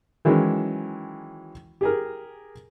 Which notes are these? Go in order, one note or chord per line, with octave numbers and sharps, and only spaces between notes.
D#3 E3 F#3 G#3 C#4
G4 G#4 A#4